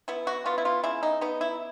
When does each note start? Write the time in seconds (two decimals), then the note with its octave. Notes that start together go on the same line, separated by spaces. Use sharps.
0.08 B3 E4
0.27 F#4
0.46 B3 F4
0.58 E4
0.65 F4
0.84 C#3 E4
1.03 D#4
1.21 B3 D#4
1.41 E4